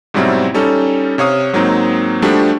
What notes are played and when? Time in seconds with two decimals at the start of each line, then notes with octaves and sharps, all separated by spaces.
0.14 G#2 B2 F#3 G3 C4 E4
0.54 G3 C#4 D#4 A4
1.18 C3 C#5 F5 D#6
1.53 G#2 F#3 A#3 C4 D#4
2.22 F3 G3 A3 D4 F#4 G4